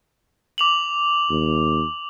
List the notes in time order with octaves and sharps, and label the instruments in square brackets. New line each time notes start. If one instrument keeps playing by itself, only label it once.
[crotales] D6 F7 F#7
[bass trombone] D#2